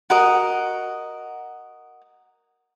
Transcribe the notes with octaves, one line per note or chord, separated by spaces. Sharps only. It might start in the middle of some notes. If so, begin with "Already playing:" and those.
F#4 A#4 D#5